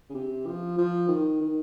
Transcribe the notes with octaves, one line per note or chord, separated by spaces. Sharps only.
C#3
C3
F3
F3
D#3
D#3